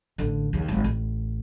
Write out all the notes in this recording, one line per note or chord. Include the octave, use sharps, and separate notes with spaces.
A1 D3
D#2 C#3
G#1 G3
A1